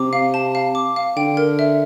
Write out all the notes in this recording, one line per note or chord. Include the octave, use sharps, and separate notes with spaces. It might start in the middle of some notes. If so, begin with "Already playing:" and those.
Already playing: C3 D6
F5
A5
F5
D6
F5
D3 G5
A#4
E5